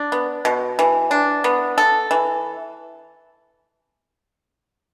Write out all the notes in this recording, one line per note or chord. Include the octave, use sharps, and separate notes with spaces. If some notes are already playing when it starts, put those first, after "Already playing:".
Already playing: D4
B3
B2
E3
D4
B3
A4
E3